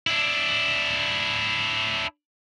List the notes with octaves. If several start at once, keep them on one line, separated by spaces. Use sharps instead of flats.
D4 E4